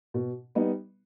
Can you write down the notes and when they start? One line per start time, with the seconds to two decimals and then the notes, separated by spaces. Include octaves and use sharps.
0.14 B2
0.55 G3 B3 D#4